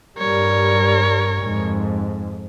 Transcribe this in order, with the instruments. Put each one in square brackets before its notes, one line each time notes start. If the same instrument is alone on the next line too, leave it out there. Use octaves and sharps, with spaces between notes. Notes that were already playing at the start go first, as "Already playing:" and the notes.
[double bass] G2 G3 [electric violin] A#4 C#5
[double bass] F2 G#2